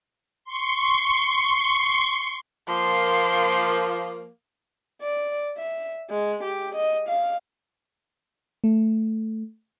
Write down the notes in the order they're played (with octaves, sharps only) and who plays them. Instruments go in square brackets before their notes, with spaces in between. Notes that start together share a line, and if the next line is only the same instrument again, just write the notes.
[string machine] C6 C#6
[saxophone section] F3 A#3 [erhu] C6
[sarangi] D5
E5
G#3
G4
D#5
F5
[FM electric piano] A3